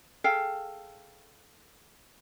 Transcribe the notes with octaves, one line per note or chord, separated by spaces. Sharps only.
G#4 A4 F5 G5